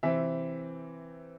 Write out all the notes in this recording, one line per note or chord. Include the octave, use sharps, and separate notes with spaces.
C3 E3 C4 E5